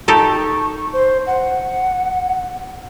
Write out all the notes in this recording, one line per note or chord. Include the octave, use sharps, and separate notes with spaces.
D#4 G4 A4 C#6
C5
F#5